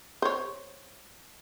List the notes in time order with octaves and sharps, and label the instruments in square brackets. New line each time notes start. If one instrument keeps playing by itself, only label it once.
[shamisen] C5 C#5